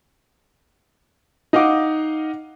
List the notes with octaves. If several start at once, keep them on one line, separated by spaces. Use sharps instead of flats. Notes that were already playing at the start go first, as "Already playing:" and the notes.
D#4 D#5 F5 F#5 D6